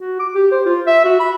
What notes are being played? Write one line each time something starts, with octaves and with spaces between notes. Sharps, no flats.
F#4
D6
G4
C5
F4
E5
F#4
B5